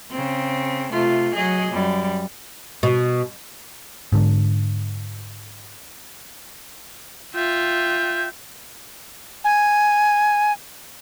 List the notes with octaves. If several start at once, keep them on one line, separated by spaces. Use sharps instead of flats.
C#3 C4
C3 A3 F4
F#3 G#4 D#5
F#2 G3
B2
G#2 D3
F4 E5 G5
G#5